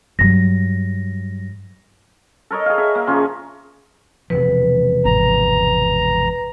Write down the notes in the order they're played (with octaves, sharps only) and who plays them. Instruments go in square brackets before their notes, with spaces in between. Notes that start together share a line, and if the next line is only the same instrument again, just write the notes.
[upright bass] G2 F#3 [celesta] A#6
[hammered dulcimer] A4 A#4 C#5 D#5
G#4 F5
G#4 E5
A#3
C#3 F3 C#4 G#4
[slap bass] E1 C3 F3 [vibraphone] B4
[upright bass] G#1 [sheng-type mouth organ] A#5